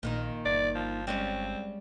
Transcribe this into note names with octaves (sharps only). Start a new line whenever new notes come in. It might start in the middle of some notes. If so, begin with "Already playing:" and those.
A#1 A#2 D#3 D#4
G1 D5
F3
G3 G#3 C4 C#4